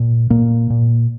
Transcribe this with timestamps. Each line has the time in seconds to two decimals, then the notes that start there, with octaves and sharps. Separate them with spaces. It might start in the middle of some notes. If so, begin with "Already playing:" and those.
Already playing: A#2
0.30 A#2 A#3
0.70 A#2